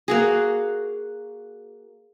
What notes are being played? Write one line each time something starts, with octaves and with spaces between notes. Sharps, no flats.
A#3 F#4 G#4